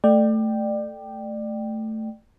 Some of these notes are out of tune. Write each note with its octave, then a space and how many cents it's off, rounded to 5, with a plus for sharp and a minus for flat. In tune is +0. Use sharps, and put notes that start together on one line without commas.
A3 +0 D5 +25 G5 -5